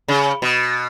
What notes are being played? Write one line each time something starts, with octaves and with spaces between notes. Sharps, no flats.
C#3
B2